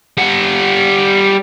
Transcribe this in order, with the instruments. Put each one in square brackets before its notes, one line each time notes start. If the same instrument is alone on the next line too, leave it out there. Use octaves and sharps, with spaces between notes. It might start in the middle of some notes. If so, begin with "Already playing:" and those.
[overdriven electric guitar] G3 F#5